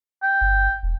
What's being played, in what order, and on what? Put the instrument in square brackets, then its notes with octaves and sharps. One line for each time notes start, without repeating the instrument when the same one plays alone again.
[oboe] G5
[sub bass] G1
E1